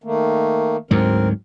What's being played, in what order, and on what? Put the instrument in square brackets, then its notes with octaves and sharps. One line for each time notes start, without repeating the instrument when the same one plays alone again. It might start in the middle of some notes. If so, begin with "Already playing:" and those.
[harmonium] D#3 A3 A#3
[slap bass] D2 G#2 F#3 [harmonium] C4 A#4